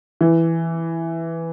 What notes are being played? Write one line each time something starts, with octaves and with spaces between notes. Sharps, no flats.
E3